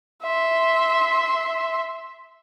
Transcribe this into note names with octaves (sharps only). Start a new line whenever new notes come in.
E5 C6